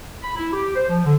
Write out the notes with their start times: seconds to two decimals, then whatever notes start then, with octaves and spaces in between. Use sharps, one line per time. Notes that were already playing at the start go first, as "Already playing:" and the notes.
0.23 B5
0.36 E4
0.53 G4
0.75 C5
0.89 F3
1.05 D3